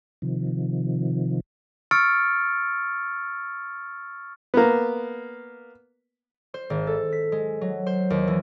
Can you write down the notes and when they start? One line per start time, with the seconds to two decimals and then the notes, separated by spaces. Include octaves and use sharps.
0.22 C3 D#3 F3
1.91 C#6 E6 F6 A6 C#7 D7
4.54 A#3 B3
6.54 C5
6.70 G#1
6.87 A4
7.12 B6
7.32 G#3
7.61 F#3
7.86 C5
8.10 D#2
8.28 E3